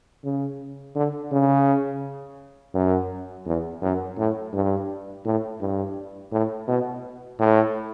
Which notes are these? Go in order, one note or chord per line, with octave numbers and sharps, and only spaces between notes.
C#3
D3
C#3
F#2
E2
F#2
A2
G2
A2
G2
A2
B2
A2